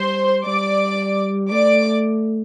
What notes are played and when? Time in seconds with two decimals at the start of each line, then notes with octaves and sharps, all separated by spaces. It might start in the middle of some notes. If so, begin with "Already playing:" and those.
Already playing: G3 C5 C6
0.45 G3 D5 D6
1.51 A3 D5 D6